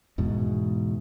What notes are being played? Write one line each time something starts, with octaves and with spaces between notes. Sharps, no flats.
E2 G#2 B2